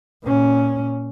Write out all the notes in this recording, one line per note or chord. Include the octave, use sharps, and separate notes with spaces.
A#2 C#4